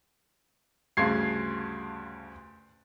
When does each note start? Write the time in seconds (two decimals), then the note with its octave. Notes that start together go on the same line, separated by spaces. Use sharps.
0.97 D2 G2 C#3 C6 G#6 C7